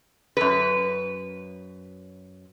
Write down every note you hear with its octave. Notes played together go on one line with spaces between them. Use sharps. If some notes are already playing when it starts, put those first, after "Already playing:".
F#2 B4